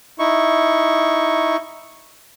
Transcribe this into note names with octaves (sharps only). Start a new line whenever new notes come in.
D#4 E4 C#6